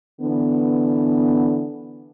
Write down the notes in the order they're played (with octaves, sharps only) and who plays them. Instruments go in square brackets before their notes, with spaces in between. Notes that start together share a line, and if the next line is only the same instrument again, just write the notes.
[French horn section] D3 E3 B3